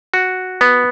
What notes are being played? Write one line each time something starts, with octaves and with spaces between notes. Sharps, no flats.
F#4
B3